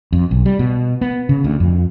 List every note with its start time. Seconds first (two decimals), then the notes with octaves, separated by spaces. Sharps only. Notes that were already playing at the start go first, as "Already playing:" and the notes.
0.13 F2
0.31 B1
0.46 G3
0.59 B2
1.01 B3
1.29 C#3
1.44 D2
1.60 F2